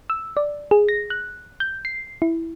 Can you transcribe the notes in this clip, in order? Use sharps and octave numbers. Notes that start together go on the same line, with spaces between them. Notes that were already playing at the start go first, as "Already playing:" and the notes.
E6
D5
G#4
A#6
F#6
G6
C7
E4